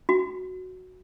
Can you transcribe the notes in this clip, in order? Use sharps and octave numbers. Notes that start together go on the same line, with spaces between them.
F#4